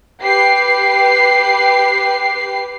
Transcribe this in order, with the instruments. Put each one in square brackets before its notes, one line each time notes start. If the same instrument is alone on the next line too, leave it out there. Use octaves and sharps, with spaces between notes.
[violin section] G4 B4 C7